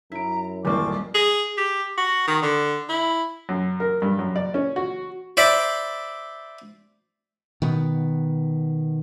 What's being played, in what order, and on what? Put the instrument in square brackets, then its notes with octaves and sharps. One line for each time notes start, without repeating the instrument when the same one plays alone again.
[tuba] F#2 [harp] E4 D7 [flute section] A#5
[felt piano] D#1 A1 [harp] G3 A#3 C4 [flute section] C#6 D6
[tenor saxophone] G#4
G4
F#4
D#3
D3
E4
[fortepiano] F#2
A#4
G2
F#2
D5
C#4
F#4
[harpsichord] C5 D5 E5 B5 D6
[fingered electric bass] B2 D#3 B3